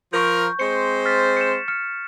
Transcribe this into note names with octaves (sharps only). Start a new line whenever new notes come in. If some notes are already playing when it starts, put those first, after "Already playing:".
F3 A#4 C#6 G6
G#3 C4 C5 C#7
F6 A6 B6
C#7 E7
F6 C#7